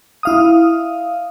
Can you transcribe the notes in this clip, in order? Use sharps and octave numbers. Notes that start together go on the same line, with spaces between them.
E4 F5 D#6